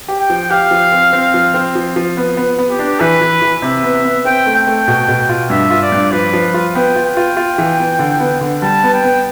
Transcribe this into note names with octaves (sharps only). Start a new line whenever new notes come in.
G4
G5
F3
G4 F5
F3
C4
C4
F3
C4
F3
F3
B3
B3
B3
G4
D4
E3 B4
E3
E3
C3 E5
B3
B3
C4 G5
A3
G5
A3
B2
B2
F4
G2 E5
F4
D5
G2
F3 B4
F3
F4
B3 G5
F4
G5
F4
F4
E3
B3
D3
B3
D3
G3 A5
B3
G5
B3